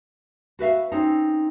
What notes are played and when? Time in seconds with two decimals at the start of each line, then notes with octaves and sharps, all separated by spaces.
0.59 F#4 B4 E5 F5
0.92 C4 C#4 D#4